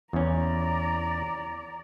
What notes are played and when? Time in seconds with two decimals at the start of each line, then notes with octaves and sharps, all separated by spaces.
0.13 E2 C#4 D5 A#5